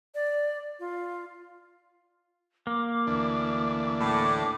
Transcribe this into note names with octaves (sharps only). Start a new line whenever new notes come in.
D5
F4
A#3 D6
D2 E3 D4
A2 D6